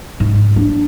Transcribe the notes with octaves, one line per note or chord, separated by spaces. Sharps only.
G#2
D4